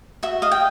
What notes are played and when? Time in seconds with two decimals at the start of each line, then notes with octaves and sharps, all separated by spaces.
0.23 F#4 E5
0.42 D#5 F5
0.52 G5